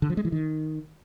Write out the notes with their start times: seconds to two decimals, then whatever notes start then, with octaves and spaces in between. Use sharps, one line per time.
0.02 D3
0.10 F3
0.17 G#3
0.25 E3
0.32 D#3